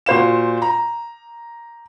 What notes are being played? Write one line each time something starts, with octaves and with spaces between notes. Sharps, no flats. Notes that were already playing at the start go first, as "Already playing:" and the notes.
A#2 F#4 C5 F5 E7
A#5